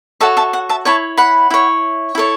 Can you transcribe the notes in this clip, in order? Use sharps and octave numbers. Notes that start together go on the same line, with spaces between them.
F#4 A4 C#5 E5 A5
E5 A5
F#5
E5 A5
E4 C#5 A5 C#6
F#5 B5
E4 C#5
E4 A4 C#5